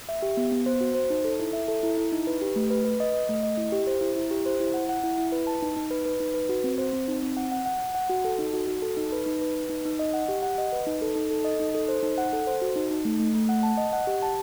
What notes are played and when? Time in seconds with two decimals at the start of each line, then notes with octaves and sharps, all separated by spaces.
0.09 E5
0.22 G4
0.37 B3
0.52 B3
0.66 C5
0.81 F#4
0.95 C5
1.10 D#4
1.25 A4
1.39 E4
1.53 E5
1.68 A4
1.83 E4
1.97 E4
2.12 D#4
2.27 B4
2.42 G4
2.56 A3
2.70 B4
2.85 B4
3.00 D#5
3.14 D#5
3.29 A3
3.43 D#5
3.57 E4
3.72 G4
3.87 C5
4.01 E4
4.16 E4
4.31 G4
4.46 C5
4.60 E4
4.74 F#5
4.89 F#5
5.04 E4
5.18 E4
5.32 B4
5.47 A5
5.62 D#4
5.76 D#4
5.91 B4
6.06 B4
6.20 D#4
6.34 B4
6.49 F#4
6.64 C4
6.78 C5
6.93 C4
7.08 D#4
7.22 C4
7.37 F#5
7.52 F#5
7.66 F#5
7.80 F#5
7.95 F#5
8.09 F#4
8.25 A4
8.38 D#4
8.53 F#4
8.67 F#4
8.82 A4
8.97 D#4
9.12 B4
9.26 D#4
9.41 B4
9.55 B4
9.69 D#4
9.85 D#4
9.99 D#5
10.14 F#5
10.28 G4
10.43 F#5
10.58 D#5
10.72 B4
10.87 D#4
11.02 A4
11.16 D#4
11.31 A4
11.45 D#5
11.60 D#4
11.75 A4
11.88 C5
12.03 D#4
12.18 F#5
12.33 A4
12.47 C5
12.62 F#4
12.76 D#4
12.91 D#4
13.05 A3
13.20 A3
13.35 A3
13.49 F#5
13.63 A5
13.78 D#5
13.93 F#5
14.07 G4
14.22 A5